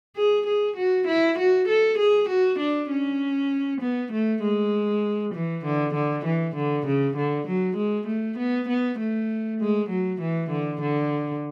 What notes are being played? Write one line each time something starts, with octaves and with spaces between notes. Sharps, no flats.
G#4
G#4
F#4
E4
F#4
A4
G#4
F#4
D4
C#4
B3
A3
G#3
E3
D3
D3
E3
D3
C#3
D3
F#3
G#3
A3
B3
B3
A3
G#3
F#3
E3
D3
D3